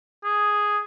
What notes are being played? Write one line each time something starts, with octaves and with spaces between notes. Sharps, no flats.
G#4